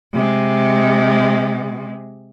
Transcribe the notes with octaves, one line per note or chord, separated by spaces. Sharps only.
C3 G#3